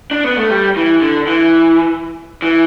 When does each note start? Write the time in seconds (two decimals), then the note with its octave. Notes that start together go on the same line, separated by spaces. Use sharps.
0.11 D4
0.24 B3
0.37 A3
0.50 G3
0.76 E3
1.01 D3
1.27 E3
2.42 E3